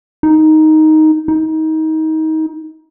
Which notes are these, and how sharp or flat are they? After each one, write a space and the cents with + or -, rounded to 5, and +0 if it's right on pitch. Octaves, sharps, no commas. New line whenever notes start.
D#4 +5
D#4 +25